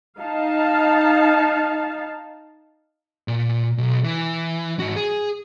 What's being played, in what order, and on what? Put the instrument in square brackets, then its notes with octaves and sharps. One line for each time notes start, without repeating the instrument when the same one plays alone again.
[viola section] D#4 F5 A5
[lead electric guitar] A#2
B1
E3
G#2 F#4
G#4